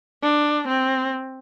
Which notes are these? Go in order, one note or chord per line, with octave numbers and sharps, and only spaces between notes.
D4
C4